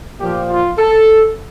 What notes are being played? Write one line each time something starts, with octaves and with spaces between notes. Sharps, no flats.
A#2 F3 G4
F4
A4